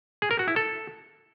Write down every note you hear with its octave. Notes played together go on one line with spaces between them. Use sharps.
G#4
A#4
F#4
E4
A4